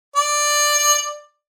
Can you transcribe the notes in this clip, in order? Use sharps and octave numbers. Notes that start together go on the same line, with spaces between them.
D5